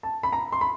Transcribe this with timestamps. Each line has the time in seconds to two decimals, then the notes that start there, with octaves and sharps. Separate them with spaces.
0.03 A5
0.23 B5
0.33 A#5
0.52 C6
0.61 B5